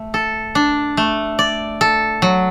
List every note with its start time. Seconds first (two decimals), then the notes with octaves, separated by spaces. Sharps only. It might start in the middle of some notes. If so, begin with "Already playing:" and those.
Already playing: A3
0.14 A4
0.55 D4
0.97 A3
1.39 D5
1.81 A4
2.22 F#3